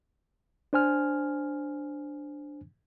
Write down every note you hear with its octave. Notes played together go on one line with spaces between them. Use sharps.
D4 C5 G#5 F6